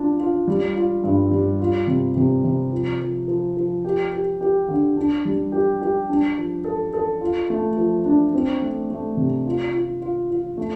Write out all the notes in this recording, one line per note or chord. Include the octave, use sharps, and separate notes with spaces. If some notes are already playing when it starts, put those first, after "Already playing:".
Already playing: D4 F4
F4
G3
F4
G2
G3
F4
C3
C3
C3
F3
F3
F3
F3
G4
G4
G4
D3
D4
G3
G4
G4
D4
F3
A4
A4
F4
A3
F3
D4
C4
A3
A3
C3
F4
F4
F4
F4
A3